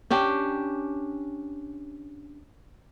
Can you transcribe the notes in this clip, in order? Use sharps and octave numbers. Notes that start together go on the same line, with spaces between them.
C#4 D4 G4